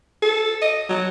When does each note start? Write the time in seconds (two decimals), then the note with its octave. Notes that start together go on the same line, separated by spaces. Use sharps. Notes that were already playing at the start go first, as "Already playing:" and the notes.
0.23 A4
0.62 D#5
0.89 F#3